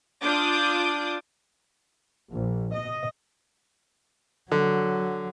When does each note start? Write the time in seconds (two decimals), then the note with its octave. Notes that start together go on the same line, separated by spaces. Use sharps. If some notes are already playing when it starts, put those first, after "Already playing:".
0.23 D4 F4 D6 D#6 G6
2.31 A#1
2.74 D#5
4.52 D3 F#3